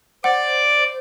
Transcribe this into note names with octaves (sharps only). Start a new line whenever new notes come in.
C5 D5 F#5 D6